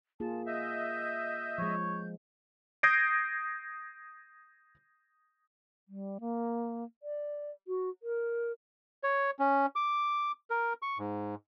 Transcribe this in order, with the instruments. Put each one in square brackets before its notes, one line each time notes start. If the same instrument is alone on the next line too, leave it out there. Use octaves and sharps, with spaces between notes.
[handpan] A#3 F4 G#4 [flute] A5
[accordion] D#5 E5 [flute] G6
[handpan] F3 G#3 [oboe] C#5
[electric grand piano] D#6 G6 G#6 A#6 C7 D7
[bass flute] G3
A#3
D5
F#4
A#4
[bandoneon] C#5
C#4
D6
A#4
C#6
G#2